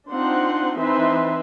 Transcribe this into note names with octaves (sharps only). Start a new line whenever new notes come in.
C4 D4 D#4 F4 F#5 C6
E3 C4 D#4 B4 E5 C6